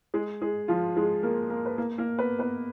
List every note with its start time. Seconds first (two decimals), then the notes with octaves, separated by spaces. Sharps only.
0.14 G#3 G#4
0.42 G#3 G#4
0.68 F3 F4
0.97 G#3 G#4
1.23 A#3 A#4
1.50 A#3 A#4
1.66 B4
1.78 A#3 A#4
1.98 A#3 A#4
2.18 B3 B4
2.39 B3 B4